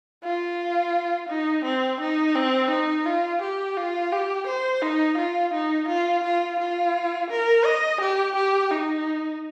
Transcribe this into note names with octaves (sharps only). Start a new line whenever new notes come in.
F4
D#4
C4
D#4
C4
D#4
F4
G4
F4
G4
C5
D#4
F4
D#4
F4
F4
F4
A#4
D#5
G4
G4
D#4